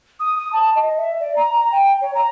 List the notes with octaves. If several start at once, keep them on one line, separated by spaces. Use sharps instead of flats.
D#6
D#6
A5
D#5
E5
D5
A#5
A#5
G5
C#5
A#5